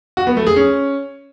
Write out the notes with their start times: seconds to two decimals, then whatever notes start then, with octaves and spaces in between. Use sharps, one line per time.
0.17 F#4
0.27 B3
0.37 A3
0.47 G#4
0.56 C#4